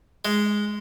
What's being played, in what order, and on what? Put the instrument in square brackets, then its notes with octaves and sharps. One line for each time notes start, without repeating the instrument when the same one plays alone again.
[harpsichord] G#3